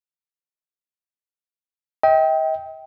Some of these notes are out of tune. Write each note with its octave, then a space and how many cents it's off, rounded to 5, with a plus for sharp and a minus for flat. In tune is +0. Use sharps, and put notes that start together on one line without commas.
D#5 +45 G5 +0